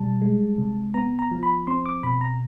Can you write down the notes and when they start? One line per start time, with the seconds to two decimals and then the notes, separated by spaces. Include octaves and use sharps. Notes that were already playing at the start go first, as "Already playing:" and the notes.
Already playing: B2 G3 A5
0.22 G#3
0.58 C3
0.94 B3 A#5
1.19 A#5
1.31 F3
1.43 B5
1.67 C4 C6
1.86 D6
2.03 B2 B5
2.21 A#5